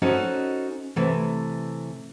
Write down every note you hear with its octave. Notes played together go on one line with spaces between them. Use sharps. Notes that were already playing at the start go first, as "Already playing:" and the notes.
C#4 D#4 F#4 A4 C5 D#5
C3 E3 A3